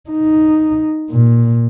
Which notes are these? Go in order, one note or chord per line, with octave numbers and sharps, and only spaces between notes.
D#4
A#2